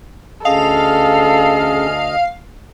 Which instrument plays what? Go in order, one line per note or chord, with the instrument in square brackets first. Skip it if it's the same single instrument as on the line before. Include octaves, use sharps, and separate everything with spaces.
[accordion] D2 D#5 [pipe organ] C#4 G#4 [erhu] A4 [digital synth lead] F5